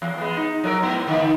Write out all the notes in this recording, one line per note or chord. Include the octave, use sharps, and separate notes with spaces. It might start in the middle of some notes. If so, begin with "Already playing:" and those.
E2
G#3 B3
D#4
F#3 D4 A#4
G#2 B3
D3 D#3